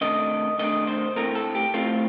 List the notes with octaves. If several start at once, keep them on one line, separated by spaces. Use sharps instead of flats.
C3 D#3 A3 D4 D#5
C3 D#3 A3 D4 D#5
C5
A2 A3 C4 A#4
A4
G4
A2 A3 C4 F4